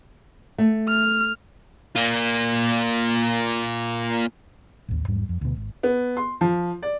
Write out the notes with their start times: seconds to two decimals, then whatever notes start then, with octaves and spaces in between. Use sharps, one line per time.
0.58 A3
0.88 F6
1.96 A#3 F4
4.89 A1 D#2
5.08 E2 G#2 G3
5.29 F2
5.41 D2 B2
5.56 G#1
5.83 B3
6.17 C6
6.41 F3
6.82 D5